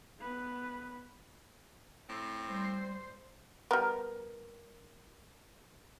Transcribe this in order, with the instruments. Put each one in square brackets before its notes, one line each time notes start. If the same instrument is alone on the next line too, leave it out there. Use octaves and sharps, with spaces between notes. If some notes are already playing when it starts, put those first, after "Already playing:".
[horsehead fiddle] B3 B4
[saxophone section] A2 C4
[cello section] G3 C5
[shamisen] G3 B3 [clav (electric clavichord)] A#4